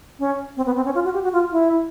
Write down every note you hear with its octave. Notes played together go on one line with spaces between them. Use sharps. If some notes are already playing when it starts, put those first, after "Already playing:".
C#4
C4
B3
C4
C#4
F4
F#4
G4
F#4
F4
E4